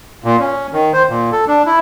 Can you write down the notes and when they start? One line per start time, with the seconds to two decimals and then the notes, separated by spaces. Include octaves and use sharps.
0.24 A#2
0.40 C#4
0.73 D#3
0.93 C5
1.09 A#2
1.32 A4
1.48 D4
1.66 E4